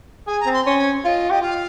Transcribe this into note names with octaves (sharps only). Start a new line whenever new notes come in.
G#4 G#5
A#5
C4
C6
C#4 C6
G#5
F4 D#5 F5
G4 D#5
F4 F5